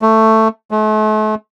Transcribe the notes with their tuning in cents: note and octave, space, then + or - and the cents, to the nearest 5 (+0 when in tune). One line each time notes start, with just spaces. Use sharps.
A3 +10
A3 -40